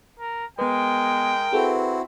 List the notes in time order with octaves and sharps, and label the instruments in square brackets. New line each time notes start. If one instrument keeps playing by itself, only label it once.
[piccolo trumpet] A#4
[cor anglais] G#3 [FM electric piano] B3 B4 [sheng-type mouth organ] A#4 [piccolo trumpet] G5
[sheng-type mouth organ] C4 E4 F#4 [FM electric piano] G#4 A4 B4